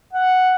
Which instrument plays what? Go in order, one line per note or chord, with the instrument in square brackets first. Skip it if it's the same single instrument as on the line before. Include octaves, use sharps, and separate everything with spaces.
[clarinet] F#5